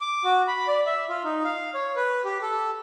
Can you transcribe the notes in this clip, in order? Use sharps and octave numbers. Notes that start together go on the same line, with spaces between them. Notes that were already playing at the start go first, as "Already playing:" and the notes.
D6
F#4
B5
D5
E5
F4
D#4
F5
C#5
B4
G4
A4